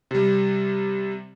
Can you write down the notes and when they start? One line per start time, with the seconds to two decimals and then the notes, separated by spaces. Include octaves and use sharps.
0.11 C3 G3